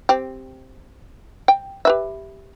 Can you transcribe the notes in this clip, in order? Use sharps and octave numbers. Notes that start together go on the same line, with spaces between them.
C4 G4
G5
G4 B4 E5